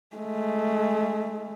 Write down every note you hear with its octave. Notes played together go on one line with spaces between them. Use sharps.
G#3 A3